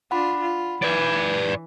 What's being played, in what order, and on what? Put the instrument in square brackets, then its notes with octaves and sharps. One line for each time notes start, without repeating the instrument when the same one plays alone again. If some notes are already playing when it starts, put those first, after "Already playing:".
[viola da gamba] D4 F4 [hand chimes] F#5 B5
[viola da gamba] F4
[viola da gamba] E3 [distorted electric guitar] B4 D5